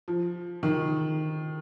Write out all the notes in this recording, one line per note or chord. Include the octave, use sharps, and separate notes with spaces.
F3
D#3